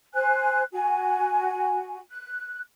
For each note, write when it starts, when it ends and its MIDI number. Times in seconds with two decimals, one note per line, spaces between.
0.14 0.62 72
0.14 0.62 80
0.14 0.62 90
0.72 1.98 66
0.72 1.98 80
2.09 2.61 90